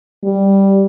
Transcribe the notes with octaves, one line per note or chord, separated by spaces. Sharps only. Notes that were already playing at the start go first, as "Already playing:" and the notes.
G3